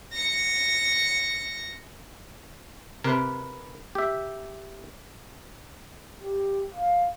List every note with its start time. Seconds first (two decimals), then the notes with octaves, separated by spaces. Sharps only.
0.12 A#6 C#7
3.04 C3 A#4 B4
3.95 G4 E5
6.22 G4
6.74 F5